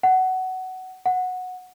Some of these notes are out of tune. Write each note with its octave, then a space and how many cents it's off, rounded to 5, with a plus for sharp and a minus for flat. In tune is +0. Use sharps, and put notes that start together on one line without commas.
F#5 +15
F#5 -10